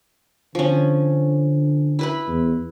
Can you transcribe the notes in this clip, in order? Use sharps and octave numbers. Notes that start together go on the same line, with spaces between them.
D3 F3 C#4
E4 B4 B5
E2